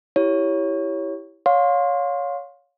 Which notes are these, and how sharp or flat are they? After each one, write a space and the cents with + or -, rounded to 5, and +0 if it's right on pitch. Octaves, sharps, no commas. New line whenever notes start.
E4 +0 G4 +0 C#5 +0
C#5 +15 F5 +25 C6 +15